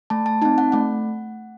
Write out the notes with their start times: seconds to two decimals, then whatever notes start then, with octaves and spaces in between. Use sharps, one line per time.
0.10 A3 A5
0.26 A5
0.42 C4 D#4 A5
0.58 F#5
0.72 A3 F#5